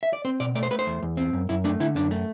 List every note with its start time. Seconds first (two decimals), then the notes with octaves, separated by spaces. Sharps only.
0.03 E5
0.13 D5
0.25 C4 C5
0.40 B2 D5
0.55 A3 D5
0.63 C5
0.71 A3 B4
0.79 C5
0.87 E2
1.02 E2
1.17 C4
1.33 F#2
1.49 F#2 E4
1.64 A3 D4
1.80 D3 E4
1.95 F#2 D4
2.11 A3